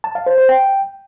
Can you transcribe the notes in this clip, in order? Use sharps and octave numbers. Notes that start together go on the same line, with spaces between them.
A5
F5
C5
C5
G5